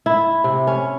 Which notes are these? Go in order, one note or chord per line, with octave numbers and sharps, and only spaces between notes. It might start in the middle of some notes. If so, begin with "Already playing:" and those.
E4
C3
C#4